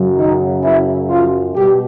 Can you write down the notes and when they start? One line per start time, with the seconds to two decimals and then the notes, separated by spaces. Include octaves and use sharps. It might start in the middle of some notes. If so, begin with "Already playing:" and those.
Already playing: F#2 C#3 F#3
0.17 D#3 D#4
0.63 E3 E4
1.09 F3 F4
1.56 B2 G3 G4